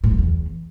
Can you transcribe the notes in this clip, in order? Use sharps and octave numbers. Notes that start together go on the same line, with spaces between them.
A2
F2
E2